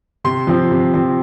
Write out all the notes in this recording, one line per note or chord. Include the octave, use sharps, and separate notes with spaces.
C3 C6
F3 C4
C3
F3 C4